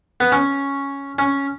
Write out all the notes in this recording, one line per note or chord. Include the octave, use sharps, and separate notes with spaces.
B3
C#4
C#4